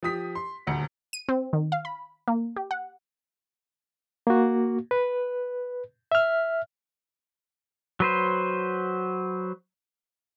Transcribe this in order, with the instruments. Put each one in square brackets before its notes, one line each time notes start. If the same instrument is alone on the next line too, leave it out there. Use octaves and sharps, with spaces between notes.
[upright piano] F3 G4 D#6 B6
C6
D#1 D2 C#7
[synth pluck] D#7
C4
D#3
F5
B5
A#3
G4
F#5
[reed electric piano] A#3 F#4
B4
E5 F6
[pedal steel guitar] F#3 B4 C5